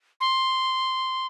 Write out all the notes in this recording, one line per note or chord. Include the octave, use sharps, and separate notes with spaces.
C6